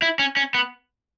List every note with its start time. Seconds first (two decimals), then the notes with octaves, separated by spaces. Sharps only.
0.02 E4
0.19 C#4
0.37 C#4
0.54 B3